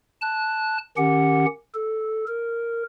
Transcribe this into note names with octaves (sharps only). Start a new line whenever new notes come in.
A5 F#6
D#3 C#4 G4 F#5
A4
A#4